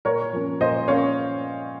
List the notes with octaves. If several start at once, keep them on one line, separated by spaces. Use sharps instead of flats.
A#2 A#4 C#5
F3 A#3 C#4
A#2 C5 D#5
A#3 C#4 C#5 F5